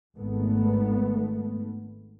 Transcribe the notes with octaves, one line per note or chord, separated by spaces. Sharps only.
G#1 A3 B3